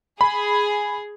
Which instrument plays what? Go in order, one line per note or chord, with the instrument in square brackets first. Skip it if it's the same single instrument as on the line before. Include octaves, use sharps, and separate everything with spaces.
[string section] G#4 [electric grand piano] B5